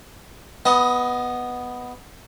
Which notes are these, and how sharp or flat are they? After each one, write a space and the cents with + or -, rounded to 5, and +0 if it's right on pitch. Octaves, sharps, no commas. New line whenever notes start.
B3 +0 D#5 +15